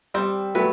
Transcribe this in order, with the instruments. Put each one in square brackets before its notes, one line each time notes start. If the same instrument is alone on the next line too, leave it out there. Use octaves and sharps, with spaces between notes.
[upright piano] G3 [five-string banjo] C4
[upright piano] F#3 A3 [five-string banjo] B4